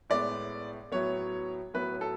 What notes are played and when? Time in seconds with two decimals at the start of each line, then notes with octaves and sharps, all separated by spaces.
0.10 A2 G#3 B3 D5
0.92 A2 F#3 B3 C#5
1.74 A2 F#3 B3 B4
2.01 A4